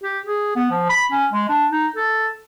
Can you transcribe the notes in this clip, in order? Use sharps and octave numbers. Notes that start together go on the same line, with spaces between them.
G4
G#4
B3
F3
B5
C#4
G#3
D4
D#4
A4